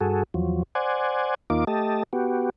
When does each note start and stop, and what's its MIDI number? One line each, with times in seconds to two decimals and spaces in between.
0.01 0.23 43
0.01 0.23 66
0.01 0.23 68
0.01 0.23 69
0.34 0.63 40
0.34 0.63 53
0.34 0.63 54
0.75 1.35 72
0.75 1.35 74
0.75 1.35 78
0.75 1.35 80
1.50 1.65 39
1.50 1.65 58
1.50 1.65 63
1.50 1.65 65
1.50 1.65 86
1.67 2.03 57
1.67 2.03 67
1.67 2.03 75
1.67 2.03 81
2.13 2.50 59
2.13 2.50 66
2.13 2.50 67